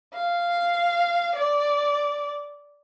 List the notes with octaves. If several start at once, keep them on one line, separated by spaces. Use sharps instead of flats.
F5
D5